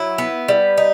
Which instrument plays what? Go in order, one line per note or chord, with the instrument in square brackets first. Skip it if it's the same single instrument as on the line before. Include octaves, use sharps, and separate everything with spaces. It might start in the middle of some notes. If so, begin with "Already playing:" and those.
Already playing: [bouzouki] F#3 E4
B3
G3
D#4